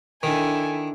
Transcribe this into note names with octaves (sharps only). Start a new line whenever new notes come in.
D#3 D4 E4 A4 G#5